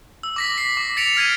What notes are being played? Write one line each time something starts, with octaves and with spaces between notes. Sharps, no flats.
E6
D6 A#6 B6
B6 C7
D6
A6 B6 C#7 D7 F7
F6 G#6 A6 D#7